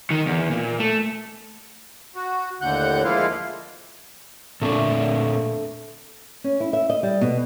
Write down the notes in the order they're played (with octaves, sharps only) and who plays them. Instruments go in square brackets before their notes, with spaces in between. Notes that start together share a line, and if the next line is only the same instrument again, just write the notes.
[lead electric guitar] D#3
E2
A#2
A3
[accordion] F#4
D#2 A2 D3 F#5 F#6 G6
F3 G#3 A#3 E4 F4 F5
[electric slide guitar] A#2 C4 D4 [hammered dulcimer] A3
[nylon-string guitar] C#4
E4
E5
D#5
G3
B2